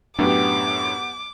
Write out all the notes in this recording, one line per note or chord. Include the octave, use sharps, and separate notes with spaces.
F#2 A2 F#3 B3 D4 G4 D6